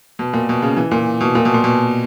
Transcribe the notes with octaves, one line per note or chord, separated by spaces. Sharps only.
B2
A#2
B2
C#3
E3
A#2
B2
A#2
B2
A#2
B2